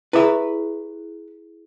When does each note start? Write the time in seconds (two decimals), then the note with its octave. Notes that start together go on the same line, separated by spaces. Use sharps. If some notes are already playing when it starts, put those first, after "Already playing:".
0.13 E4 G4 G#4 B4 E5